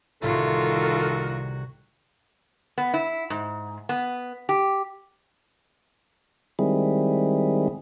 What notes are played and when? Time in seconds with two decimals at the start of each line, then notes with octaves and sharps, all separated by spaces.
0.23 C2 A2 D#3 F4 F#4 A4
2.78 B3
2.94 E4
3.30 G#2
3.89 B3
4.49 G4
6.59 D#3 G3 G#3 C4 E4 G#4